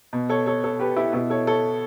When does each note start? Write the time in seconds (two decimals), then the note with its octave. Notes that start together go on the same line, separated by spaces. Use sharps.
0.13 B2
0.29 A4 C#5
0.46 A4 C#5
0.64 A4 C#5
0.80 G4 B4
0.97 E4 G4
1.13 B2 E4
1.30 A4 C#5
1.47 A4 C#5